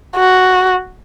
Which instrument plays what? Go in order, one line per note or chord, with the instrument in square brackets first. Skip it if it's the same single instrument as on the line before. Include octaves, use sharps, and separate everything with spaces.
[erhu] F#4